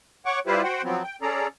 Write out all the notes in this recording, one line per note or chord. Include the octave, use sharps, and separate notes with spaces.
C#5 F#5 C#6 D6
G3 E4 F4 G4 B4 C5
F#4 C5 F#5 G5
F3 F#3 B3 C4
G5
C#4 G#4 A4 D5 A#5